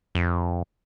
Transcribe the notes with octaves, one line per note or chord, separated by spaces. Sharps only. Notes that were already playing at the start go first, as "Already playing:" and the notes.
F2